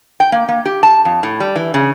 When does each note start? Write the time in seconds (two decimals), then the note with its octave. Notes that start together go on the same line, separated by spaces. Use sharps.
0.20 G5
0.32 A#3
0.49 A#3
0.65 G4
0.83 A5
1.05 F2
1.23 A2
1.40 G3
1.56 E3
1.74 C#3